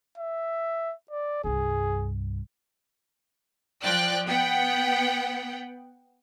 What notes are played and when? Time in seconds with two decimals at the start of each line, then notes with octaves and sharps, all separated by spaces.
0.17 E5
1.11 D5
1.44 C2 G2 G#4
3.83 F3 D5 G5 F#6
4.27 B3 F#5 G5